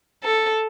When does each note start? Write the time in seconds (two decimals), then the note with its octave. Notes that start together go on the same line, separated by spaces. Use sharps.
0.24 A4